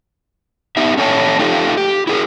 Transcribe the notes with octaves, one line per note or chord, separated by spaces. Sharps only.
B3 D#4 G4 E5
C#4 D4 A4 C#5 E5 A5
A3 D#4 F4 G4 A4
G4
E4 G#4 A#4